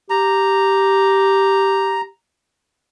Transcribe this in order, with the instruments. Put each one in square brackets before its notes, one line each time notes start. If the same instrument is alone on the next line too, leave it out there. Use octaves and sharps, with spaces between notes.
[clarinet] G4 [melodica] A#5